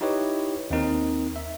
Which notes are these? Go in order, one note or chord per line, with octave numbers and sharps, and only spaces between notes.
D#4 E4 G4 B4 C#5 D#5
D#2 C4 D#4 A#4
E5